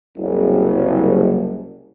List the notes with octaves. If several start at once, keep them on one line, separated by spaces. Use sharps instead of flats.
F#1 C2